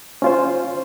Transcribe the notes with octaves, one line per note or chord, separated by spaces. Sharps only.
C#4 F4 C5